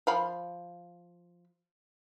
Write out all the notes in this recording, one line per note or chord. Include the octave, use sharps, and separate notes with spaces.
F3 F5 B5